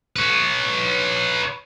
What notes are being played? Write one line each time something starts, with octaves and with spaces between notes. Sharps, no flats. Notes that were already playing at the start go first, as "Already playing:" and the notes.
B4 C#5